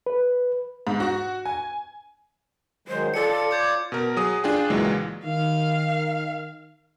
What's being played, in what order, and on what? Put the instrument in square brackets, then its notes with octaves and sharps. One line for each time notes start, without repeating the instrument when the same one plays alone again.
[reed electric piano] B4
[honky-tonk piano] G#2
F#4
G#5
[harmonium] D#3 F#3 G#3 [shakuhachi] C5
[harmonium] F4 D5 [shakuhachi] A4 [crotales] C#7
[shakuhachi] C#5 [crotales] D6 G6 G#6
[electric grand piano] B2 A#4
F#3 G#4 D#6
D4 F4 G#4 G5
C#2 A#2 E3 F#3 G#3
[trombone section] D#3 [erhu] F5